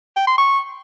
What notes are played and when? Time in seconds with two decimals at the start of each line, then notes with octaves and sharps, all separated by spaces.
0.16 G5
0.27 C6
0.38 C#6